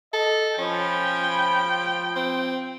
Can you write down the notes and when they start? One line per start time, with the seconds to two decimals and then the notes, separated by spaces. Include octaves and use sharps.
0.13 A4 D#5
0.58 F3 C#4 G5 B5
2.16 C4